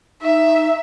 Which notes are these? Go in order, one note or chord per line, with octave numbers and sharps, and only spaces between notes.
D#4 E5